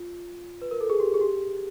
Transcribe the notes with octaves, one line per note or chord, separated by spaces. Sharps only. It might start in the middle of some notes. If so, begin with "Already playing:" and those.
Already playing: F4
B4
A#4
A4
G#4
G4
G#4
G4